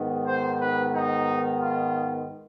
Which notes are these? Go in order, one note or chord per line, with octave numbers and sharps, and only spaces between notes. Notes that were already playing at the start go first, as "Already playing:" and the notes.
Already playing: G#2 D#3 B3
C5
B4
D#4
F4